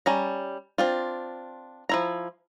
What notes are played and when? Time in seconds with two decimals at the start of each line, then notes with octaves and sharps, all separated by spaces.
0.06 G3 C#4 A#5
0.78 C4 D4 F4
1.89 F3 E4 A#5